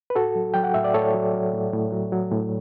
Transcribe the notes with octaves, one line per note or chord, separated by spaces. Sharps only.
B4
A2 F#4 A4
F#3
F#3 G5
F#5
A2 E5
D5
A2 A4 C#5
F#3
F#3
A2
A2
F#3
F#3
A2